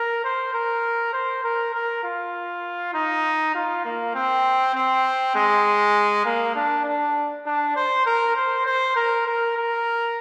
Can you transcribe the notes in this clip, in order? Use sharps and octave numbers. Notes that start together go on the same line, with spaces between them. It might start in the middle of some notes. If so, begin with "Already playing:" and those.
Already playing: A#4
C5
A#4
C5
A#4
A#4
F4
D#4
F4
A#3
C4
C4
G#3
A#3
D4
D4
D4
C5
A#4
C5
C5
A#4
A#4
A#4